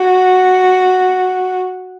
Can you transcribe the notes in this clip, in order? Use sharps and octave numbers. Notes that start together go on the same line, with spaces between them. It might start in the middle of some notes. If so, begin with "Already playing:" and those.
Already playing: F#4